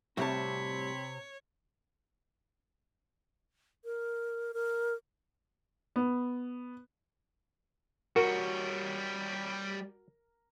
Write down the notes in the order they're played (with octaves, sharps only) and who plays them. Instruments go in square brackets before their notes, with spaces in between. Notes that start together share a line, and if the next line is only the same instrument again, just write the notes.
[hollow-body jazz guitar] A2 G3 F#4 [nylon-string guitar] C3 A5 [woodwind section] C4 B5 [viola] C#5
[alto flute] A#4
A#4
[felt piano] B3
[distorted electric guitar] G3 C#5 [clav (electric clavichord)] F#4 [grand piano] A#4